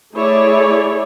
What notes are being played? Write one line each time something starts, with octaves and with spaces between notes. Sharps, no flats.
A3 E4 G#4 C#5 D5